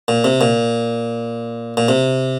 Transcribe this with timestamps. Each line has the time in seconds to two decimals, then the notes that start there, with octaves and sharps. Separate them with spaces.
0.08 A#2
0.24 C3
0.41 A#2
1.77 A#2
1.89 C3